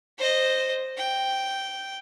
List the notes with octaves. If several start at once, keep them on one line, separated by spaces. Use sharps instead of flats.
C5 D#5
G5